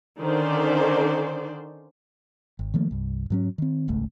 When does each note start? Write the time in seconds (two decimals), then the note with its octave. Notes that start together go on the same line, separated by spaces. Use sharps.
0.20 D3 D#3 C#4 C5 D5
2.59 G#1
2.74 D#3 F3 A3 A#3
2.91 C2 G2
3.30 G#2 F#3 C#4
3.58 D#3 C4
3.88 D#1 G#1 C#2 A3